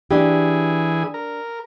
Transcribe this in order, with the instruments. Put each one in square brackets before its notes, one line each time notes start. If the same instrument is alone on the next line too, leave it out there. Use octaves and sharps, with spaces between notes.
[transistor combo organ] E3 G#4 [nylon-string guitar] D4 G4
[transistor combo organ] A#4